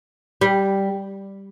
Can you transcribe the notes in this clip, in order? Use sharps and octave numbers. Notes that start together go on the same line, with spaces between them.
G3